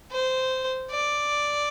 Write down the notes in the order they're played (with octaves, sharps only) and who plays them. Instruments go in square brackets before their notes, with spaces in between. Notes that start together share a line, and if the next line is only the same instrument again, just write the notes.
[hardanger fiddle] C5
D5